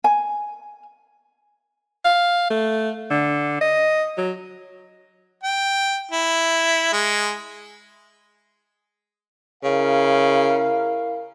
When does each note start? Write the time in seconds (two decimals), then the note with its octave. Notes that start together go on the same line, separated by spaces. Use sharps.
0.04 G#5
2.05 F5
2.51 A3
3.11 D3
3.61 D#5
4.18 F#3
5.43 G5
6.11 E4
6.93 G#3
9.64 C#3 E4 A#4 F5